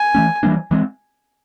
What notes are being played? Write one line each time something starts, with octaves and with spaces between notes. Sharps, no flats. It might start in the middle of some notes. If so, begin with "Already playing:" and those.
Already playing: G#5
E3 A3 C#4
E3 G3 A#3 D4
E3 G#3 C4